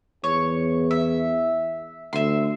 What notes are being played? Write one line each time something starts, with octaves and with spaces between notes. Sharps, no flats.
E2 C#5
E5
D2 E5 C6